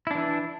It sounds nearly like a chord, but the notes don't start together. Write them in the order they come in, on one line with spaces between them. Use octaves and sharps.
E4 D4 E3